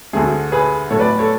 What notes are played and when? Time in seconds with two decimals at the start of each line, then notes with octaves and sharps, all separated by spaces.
0.13 D2 D3 A3 G#4
0.52 G#4 B4
0.90 A2 F#3 A3 A4 C#5
1.00 B4 D5
1.19 A4 C#5